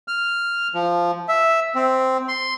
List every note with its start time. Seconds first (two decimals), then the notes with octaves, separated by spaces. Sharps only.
0.08 F6
0.74 F3
1.28 E5
1.75 C4
2.28 C6